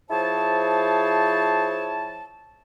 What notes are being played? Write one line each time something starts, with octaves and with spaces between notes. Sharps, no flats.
F3 E4 G#4 C5 C#5 A5